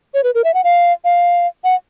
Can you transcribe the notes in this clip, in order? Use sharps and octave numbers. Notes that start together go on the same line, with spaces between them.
C#5
B4
A#4
E5
F#5
F5
F5
F#5